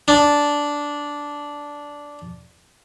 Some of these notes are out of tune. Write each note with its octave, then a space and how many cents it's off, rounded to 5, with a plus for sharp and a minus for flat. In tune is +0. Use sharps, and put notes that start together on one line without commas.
D4 -10